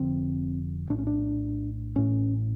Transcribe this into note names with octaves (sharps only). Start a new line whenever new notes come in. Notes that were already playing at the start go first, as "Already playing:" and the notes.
Already playing: F1 F2 D3 C4
A#1 A2 D4
C#4
D4
A1 A2 C#4